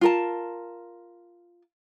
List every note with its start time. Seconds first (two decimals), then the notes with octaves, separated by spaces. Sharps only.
0.01 F4 A#4 A5